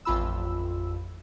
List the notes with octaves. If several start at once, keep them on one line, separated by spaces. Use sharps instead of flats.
A1 F2 F4 B5 E6